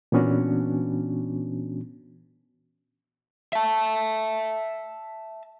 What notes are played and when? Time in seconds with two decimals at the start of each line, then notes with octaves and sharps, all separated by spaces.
0.12 A#2 E3 B3 C#4 D4 F#4
3.53 E5 A5